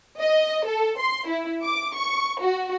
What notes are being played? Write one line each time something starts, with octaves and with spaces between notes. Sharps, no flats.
D#5
A4
C6
E4
D6
C#6
F#4